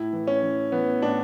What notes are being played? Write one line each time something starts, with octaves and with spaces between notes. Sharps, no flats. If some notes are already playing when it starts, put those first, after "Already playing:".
Already playing: A2 E4
E3
C#4
E3
E3 B3
A2 D4